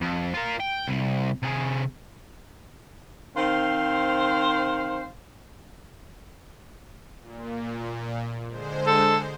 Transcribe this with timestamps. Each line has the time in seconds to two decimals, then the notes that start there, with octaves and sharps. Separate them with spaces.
0.01 F2
0.34 F4 A#4
0.60 G5
0.88 C2
1.43 C3 G#4
3.37 D#3 C4 C5 F5
7.21 A#2
8.48 D3 G#3 C5
8.87 A4